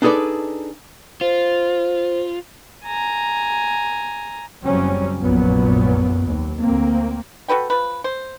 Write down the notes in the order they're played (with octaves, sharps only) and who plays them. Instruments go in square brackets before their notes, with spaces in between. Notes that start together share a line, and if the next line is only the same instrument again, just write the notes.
[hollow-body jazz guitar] D4 D#4 G#4 A4 B4 D5
[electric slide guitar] F4 [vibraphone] C5
[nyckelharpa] G#5 A#5
[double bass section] F#1 C#3 F#3 G3 C4 C#4
F1 A#1 F#2 A#2 F#3 B3
D#2
D2 A#3 C4
[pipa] F#4 A4 B4 G5
F3 B4
C5